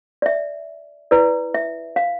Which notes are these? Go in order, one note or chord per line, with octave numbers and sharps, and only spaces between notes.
D5
E5
E4 B4 D5
E5
F5